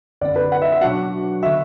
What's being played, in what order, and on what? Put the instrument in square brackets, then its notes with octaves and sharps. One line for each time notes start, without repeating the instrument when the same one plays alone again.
[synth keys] F#2 D3 B3 [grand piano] D5
[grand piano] B4
F#5
E5
E5
[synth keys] B2 F#3 D4 F#4 [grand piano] F#5
[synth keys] D3 B3 F#4 [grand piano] E5